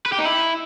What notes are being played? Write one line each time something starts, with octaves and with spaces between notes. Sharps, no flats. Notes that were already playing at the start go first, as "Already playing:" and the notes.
B4
G4
D#4
E4